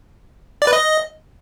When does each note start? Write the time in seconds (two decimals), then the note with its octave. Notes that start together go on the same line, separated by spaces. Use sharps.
0.62 D5
0.67 B4
0.73 D#5